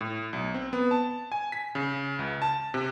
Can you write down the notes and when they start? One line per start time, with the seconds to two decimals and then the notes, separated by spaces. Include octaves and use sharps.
0.01 A2
0.33 B1
0.54 C4
0.73 B3
0.91 A5
1.32 G#5
1.52 B6
1.75 C#3
2.19 C#2
2.42 A5
2.74 C3